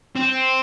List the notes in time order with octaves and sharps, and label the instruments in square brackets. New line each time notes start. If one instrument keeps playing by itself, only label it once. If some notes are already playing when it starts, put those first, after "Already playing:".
[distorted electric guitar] C4